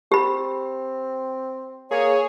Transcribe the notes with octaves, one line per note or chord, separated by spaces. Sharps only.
C4 G4 B5
A#3 G#4 C#5